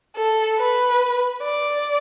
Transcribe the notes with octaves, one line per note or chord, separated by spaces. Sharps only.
A4
B4
D5